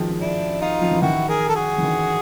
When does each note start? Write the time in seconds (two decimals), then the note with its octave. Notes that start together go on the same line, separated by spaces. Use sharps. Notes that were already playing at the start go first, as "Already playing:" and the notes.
Already playing: D#3 F3 F#3 G#3
0.21 D4 E4
0.61 D#4 F4
0.81 F3
0.91 E3
1.02 D#3 E4 F#4
1.29 G#4 A#4
1.49 A4
1.55 F#4 G#4
1.78 E3
1.82 D#3